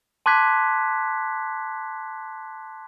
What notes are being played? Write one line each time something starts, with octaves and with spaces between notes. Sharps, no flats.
A5 C6 D6 F#6 G#6 B6